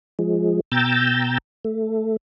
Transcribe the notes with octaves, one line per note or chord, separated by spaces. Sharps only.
F3 G#3
B2 G5 A#5 E6 G6 A6
A3